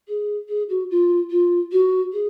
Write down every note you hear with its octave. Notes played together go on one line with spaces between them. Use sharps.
G#4
G#4
F#4
F4
F4
F#4
G#4